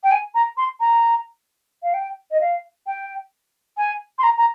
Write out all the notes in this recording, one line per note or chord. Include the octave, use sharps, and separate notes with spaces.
G5
G#5
A#5
C6
A#5
F5
G5
D#5
F5
G5
G#5
C6
A#5
A#5